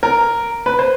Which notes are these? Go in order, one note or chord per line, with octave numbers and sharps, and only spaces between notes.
A#4
B4
C5